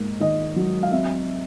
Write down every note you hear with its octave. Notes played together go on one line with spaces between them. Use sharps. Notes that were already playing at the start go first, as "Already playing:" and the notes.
Already playing: G#2 A#3
D#3 D#5
F#3
F5
C4 E5